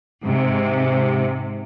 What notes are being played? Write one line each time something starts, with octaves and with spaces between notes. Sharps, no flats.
G#2 C3